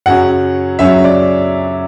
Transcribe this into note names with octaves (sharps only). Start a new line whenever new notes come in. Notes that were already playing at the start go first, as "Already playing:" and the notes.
F#2 C#3 F#3 C#4 F#5
F#2 C#3 F#3 C#4 E5
D5